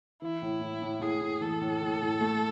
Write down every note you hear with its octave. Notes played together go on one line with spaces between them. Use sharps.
E3 E4
A2
A2
A2
A2 G#4
A2
E3 A4
A2
A2
A2
A3